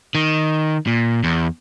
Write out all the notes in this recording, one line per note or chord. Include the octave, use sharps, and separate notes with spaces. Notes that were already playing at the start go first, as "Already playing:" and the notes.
D#3
A#2
E2